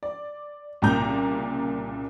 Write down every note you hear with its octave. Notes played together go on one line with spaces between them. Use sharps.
D5
C2 A#2 C#3 A#5 G6